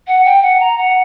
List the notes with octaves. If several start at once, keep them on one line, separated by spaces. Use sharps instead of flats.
F#5
G5
F#5
A#5
F#5